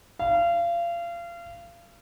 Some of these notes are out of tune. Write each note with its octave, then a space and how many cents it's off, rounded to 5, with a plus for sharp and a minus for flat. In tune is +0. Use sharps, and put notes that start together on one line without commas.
F5 -30